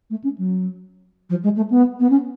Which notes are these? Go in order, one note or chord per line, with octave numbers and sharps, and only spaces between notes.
A3
C#4
F#3
F3
G#3
A3
B3
B3
C#4